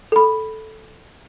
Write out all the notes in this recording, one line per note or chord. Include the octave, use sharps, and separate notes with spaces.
A4 B5